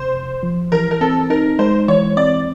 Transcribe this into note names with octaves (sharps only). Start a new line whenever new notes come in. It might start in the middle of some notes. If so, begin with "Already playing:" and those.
Already playing: C3 C5
F2
F3
E3 A#4
A#4
C4 A4
D#4 A#4
G#3 C5
E3 C#5
C4 D5